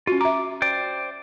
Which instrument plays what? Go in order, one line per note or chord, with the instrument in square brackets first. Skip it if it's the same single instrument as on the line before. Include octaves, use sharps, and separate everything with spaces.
[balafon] C#4 F#4 [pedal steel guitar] F4
[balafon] E5 A#5 [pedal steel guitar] D6
[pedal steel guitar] C5 D5 G5